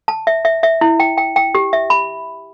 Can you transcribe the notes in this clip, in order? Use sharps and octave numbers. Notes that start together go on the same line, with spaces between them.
A5
E5
E5
E5
E4
G5
G5
G5
G4
E5
B5